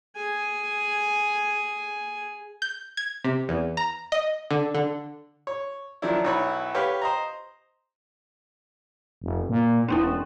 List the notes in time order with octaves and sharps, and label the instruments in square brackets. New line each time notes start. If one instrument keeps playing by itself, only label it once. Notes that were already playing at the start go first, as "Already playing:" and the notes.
[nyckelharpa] G#4 G#5
[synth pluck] G6
G#6
C3
E2
A#5
D#5
D3
D3
[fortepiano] C#5
D#3 F3 F#3 D4 E4
B1 E4 C#5 B5
G4 B4 C#5 F5 G5
C5 D#5 A#5
[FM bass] F1
A#2
[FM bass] E1 [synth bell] C#4 D4 E4